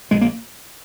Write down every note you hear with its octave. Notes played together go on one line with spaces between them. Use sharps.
A#1 G#3
A#3